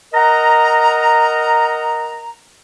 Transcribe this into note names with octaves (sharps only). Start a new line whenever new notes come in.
A#4 D#5 F#5 A#5